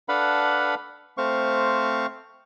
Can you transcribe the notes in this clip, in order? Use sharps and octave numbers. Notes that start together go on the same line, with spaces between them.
D4 A4 B4 F5 F#5 B5
A3 C4 C5 F5 C#6